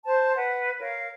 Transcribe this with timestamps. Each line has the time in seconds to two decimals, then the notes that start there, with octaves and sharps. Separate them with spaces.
0.06 C5 A5
0.35 B4 F#5
0.80 A#4 C#5 F5